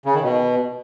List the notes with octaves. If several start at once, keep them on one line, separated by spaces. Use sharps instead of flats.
C#3
D#3
B2